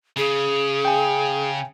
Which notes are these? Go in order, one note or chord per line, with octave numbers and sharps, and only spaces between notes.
C#3 G#4
G5 G#5